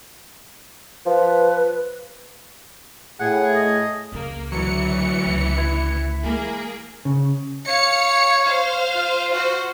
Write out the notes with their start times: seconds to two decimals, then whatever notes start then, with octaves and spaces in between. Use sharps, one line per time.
1.06 F3 B4
3.20 A2 G#4 F#5
3.55 D#5
4.12 C#2 C#3 A#3
4.52 D2 E3 F#3 C#7
5.26 C#2
5.58 E4
6.23 E3 G#3 A#3 G#4
7.05 C#3
7.67 C#5 F5 C#7
8.45 C5 F5
8.96 F4
9.33 F#4 C5